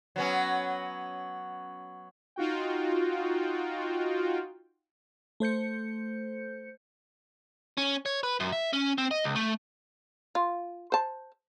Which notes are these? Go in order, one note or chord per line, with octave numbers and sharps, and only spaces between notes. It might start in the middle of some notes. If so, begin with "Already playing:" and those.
F#3 B3 C#4
D#4 F4 F#4 G5
A3 C5 G6 C#7
C#4
C#5
B4
F#2
E5
C#4
C4
D#5
C#2
A3
F4
C5 A5